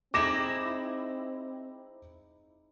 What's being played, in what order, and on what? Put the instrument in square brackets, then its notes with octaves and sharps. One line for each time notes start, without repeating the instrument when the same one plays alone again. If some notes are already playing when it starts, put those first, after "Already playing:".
[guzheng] G#3 D#4 E4 [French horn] C4 [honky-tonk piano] D6 A#6 E7